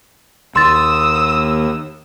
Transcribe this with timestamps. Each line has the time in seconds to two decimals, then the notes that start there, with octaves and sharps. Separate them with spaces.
0.56 D#2 C6 D#6 E6 A6